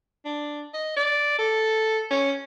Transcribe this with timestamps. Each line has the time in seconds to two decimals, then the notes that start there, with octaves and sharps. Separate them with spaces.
0.25 D4
0.74 D#5
0.97 D5
1.38 A4
2.10 C#4